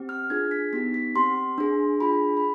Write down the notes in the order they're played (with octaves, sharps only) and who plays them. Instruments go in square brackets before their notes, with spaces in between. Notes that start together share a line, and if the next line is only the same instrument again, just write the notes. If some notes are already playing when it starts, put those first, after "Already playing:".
Already playing: [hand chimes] C4 G4
F6
D4 F4 G#4 G#6
B6
B3 D#4 G4 B6
B6
C4 G4 C6
D4 G#4
D4 F4 G#4 B5
B5